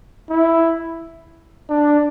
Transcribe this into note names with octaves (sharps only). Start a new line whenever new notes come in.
E4
D4